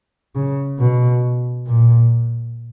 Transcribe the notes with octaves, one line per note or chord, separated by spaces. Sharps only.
C#3
B2
A#2